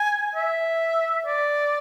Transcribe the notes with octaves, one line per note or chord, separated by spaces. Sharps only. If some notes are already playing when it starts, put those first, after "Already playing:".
Already playing: G#5
E5
D5